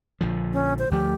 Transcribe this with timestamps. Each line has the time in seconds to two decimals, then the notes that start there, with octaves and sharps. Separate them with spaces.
0.21 A#1 D3 F3
0.53 C#4
0.79 C5
0.91 D2 F3 A3 G4